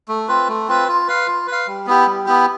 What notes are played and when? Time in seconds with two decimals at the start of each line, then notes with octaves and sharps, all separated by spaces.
0.08 A3
0.28 C4 F4 B4
0.48 A3
0.68 C4 F4 B4
0.88 F4
1.08 B4 F5
1.27 F4
1.47 B4 F5
1.67 G3
1.87 B3 E4 G4
2.06 G3
2.26 B3 E4 G4